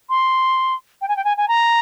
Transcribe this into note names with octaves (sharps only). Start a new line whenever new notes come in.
C6
G5
G#5
G5
G#5
G#5
A#5